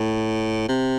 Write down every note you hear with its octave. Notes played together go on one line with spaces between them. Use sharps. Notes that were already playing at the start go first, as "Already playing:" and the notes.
Already playing: A2
C3